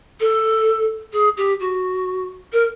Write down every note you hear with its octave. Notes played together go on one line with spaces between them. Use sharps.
A4
G#4
G4
F#4
A#4